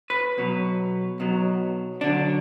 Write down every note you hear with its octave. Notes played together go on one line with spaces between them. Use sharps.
B4
B1 B2 F#3
B1 B2 F#3
D2 D3 F#3 D4